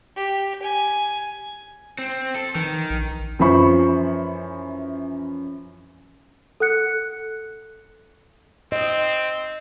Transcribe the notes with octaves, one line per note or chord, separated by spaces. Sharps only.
G4
G#5
C4
A4
D#3 E3
A#1
F#2 E3 F3 C5 B5 C#6
A4 F#5 F#6 C#7
C4 D#5